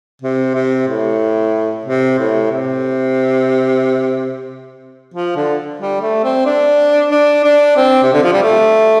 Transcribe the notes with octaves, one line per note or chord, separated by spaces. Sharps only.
C3
C3
A2
C3
A2
C3
F3
D3
G3
A3
C4
D4
D4
D4
C4
C3
D3
F3
G3
A3